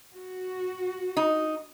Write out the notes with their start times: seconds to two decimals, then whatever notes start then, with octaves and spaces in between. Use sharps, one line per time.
0.14 F#4
1.17 D#4